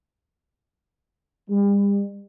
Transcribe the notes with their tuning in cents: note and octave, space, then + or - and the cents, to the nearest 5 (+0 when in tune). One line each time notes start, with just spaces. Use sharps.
G3 +40